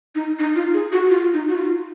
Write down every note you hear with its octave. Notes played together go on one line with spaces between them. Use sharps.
D#4
D#4
F4
G#4
F#4
F4
D#4
F#4
F4